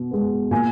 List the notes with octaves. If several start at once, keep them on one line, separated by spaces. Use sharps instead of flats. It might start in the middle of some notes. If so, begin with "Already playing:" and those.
Already playing: B2
G#3 B3
A#2 G#5